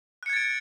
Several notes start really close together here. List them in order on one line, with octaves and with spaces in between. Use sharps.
F#6 C#7 G#6 A6 D7